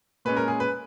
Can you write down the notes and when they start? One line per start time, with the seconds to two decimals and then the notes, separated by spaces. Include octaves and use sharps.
0.25 A#2 G#3 C#4 B4
0.37 A#4
0.48 G#4
0.60 B4